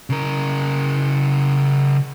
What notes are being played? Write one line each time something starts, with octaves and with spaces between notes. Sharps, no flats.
C#3 A#4